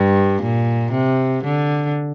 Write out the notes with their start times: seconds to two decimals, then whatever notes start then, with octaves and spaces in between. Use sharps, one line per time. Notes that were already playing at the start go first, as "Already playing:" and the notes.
Already playing: G2
0.42 A#2
0.92 C3
1.43 D3